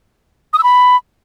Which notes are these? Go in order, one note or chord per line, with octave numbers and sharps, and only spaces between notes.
D#6
E6
B5